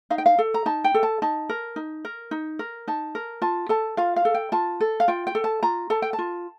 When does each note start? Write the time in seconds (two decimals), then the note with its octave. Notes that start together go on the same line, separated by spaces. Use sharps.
0.10 D#4 F5
0.18 G5
0.26 F5
0.39 A4
0.54 A#5
0.66 D#4 A5
0.84 G5
0.94 A4
1.03 A5
1.22 D#4 A5
1.49 A#4
1.76 D#4
2.05 A#4
2.31 D#4
2.59 A#4
2.87 D#4 A5
3.15 A#4
3.42 F4 A5
3.69 A4 A5
3.97 F4 F5
4.16 F5
4.25 A4
4.34 G5
4.52 F4 A5
4.80 A4
5.00 F5
5.08 F4 G5
5.27 G5
5.35 A4
5.44 A5
5.63 F4 A#5
5.90 A4 A5
6.02 G5
6.13 A5
6.19 F4